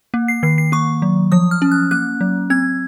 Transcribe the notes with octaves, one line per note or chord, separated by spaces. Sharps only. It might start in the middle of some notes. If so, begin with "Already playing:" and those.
A#3
C7
D#3 C7
C7
A#3 C#6
F#3
F3 D#6
F6
C#4
F#6
A#3 F#6
F#3
C4 G#6